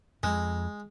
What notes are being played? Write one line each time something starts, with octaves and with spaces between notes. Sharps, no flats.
F2 G#3